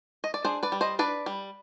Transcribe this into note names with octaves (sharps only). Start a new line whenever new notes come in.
D#5
D5
D4 G#4 C5
B4 D5
G3
C5 D#5
D4 B4 D5
G3